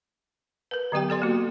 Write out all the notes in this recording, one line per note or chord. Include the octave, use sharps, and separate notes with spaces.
A#4 B4
D3 F#3 B3 G4 G5
B3 A4 D5 C6
A#3 F#4